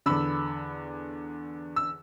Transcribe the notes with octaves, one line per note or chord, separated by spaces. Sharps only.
E2 D3 B5 E6
E6